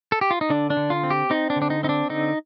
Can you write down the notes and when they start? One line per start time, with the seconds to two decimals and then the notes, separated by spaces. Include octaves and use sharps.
0.12 A4
0.21 G4
0.31 F4
0.41 D#4
0.50 D3 D4
0.70 D4
0.77 D3
0.90 F4
1.03 C4
1.10 G4
1.30 C4 D#4
1.50 D4
1.56 D3
1.62 D4
1.70 D#4
1.83 C4 D#4
1.89 D4
2.10 D3 D#4